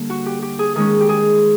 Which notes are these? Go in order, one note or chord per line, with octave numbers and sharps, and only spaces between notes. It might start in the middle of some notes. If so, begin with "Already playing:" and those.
Already playing: D3 G3 A#3
F#4
G4
G4
G#4
D#3 G#3 C#4 G#4
G4
G#4